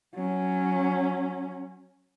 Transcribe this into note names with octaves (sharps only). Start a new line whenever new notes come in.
F#3 C#4